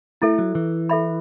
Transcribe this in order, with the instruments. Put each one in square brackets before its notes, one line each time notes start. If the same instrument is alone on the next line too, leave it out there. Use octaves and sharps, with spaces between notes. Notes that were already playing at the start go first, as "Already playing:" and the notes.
[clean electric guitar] A3 [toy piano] E4 A4 E5
[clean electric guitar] F#3
E3
[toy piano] A4 E5 B5